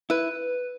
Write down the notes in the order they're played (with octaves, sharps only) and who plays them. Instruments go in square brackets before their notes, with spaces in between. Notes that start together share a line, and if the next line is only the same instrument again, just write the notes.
[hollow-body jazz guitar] E4 [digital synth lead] B4